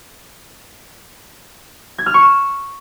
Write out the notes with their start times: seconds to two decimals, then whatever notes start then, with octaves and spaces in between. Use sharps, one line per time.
1.98 G#6
2.06 F6
2.14 C#6
2.22 E7